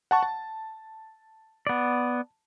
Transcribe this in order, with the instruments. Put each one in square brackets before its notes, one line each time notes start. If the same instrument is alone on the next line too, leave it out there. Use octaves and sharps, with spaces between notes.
[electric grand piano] F#5 A5 C#6
A5
[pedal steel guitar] B3 D5